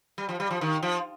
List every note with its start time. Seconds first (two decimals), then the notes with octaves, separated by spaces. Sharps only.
0.18 G3
0.29 F3
0.40 G3
0.51 F3
0.61 D#3
0.83 F3